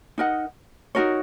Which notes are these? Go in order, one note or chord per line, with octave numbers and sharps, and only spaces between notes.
D#4 A#4 D#5 F#5
D#4 F#4 A#4 C#5